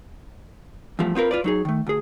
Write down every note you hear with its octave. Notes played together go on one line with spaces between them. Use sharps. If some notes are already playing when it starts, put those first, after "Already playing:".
E2 G2 F3 A3
B3 C4 F4 A#4 B4
F4 B4 D5
F#3 D#4 G#4
D#3 A3
D2 G#4